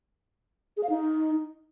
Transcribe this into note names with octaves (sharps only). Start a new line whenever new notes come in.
G#4
F5
D#4